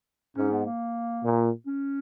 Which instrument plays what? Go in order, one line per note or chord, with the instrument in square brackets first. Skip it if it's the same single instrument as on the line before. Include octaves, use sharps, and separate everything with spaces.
[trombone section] G#2 [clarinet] C#4
[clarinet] B3
A#3
[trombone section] A#2
[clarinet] C#4